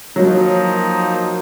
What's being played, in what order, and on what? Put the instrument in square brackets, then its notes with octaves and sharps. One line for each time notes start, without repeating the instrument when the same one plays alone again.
[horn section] F3 A#3 D#4 [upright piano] F#3